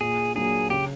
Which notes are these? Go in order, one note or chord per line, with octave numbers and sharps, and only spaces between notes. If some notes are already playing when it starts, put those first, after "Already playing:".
A#2 G#4
F#3 A#3 D4 G#4
C#3 G4